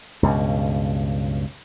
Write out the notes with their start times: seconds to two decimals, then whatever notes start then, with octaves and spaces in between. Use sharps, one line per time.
0.23 C#2 G2 B2